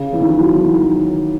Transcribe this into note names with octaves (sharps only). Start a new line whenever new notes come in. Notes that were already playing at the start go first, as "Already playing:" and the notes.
Already playing: C#3
E3
D#3
E3
F#3
E3
D#3